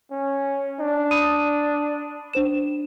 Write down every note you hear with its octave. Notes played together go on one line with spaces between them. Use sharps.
C#4
D4
B5 D#6 D#7
D4 C5 E7